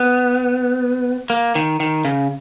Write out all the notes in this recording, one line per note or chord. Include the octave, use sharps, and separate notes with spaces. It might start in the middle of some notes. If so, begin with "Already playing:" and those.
Already playing: B3
A#3
D#3
D#3
C#3